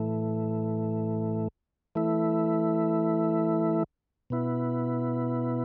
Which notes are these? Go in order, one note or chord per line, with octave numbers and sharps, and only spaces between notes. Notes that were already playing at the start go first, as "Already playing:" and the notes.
Already playing: A2 E3 A3
E3 A3 E4
B2 B3 E4